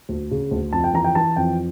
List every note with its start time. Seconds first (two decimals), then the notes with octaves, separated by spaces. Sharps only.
0.09 D2
0.31 C#3
0.51 D2
0.73 F2 A5
0.84 G5
0.94 E3 A#5
1.04 G5
1.15 E3 A5
1.36 F2 G5